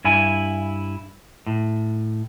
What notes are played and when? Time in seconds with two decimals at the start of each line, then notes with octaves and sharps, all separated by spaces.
0.05 G2 E4 G#5
1.47 A2